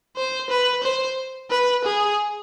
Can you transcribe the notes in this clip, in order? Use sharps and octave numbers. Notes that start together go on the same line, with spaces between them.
C5
B4
C5
B4
G#4